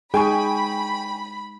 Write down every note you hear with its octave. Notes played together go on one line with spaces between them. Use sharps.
G#3 D#4 G#4 G5 G#5 B5 C#6